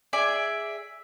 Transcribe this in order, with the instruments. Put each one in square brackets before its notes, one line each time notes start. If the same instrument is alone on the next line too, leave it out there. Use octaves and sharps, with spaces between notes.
[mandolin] G#4 D5 E5